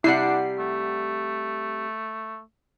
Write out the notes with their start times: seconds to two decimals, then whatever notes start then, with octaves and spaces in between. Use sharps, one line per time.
0.04 C3 G3 D4 E4 F#5 C7
0.58 A3